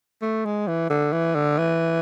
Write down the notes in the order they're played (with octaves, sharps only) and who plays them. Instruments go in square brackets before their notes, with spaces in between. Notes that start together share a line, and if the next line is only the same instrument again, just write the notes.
[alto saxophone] A3
G#3
E3
D3
E3
D3
E3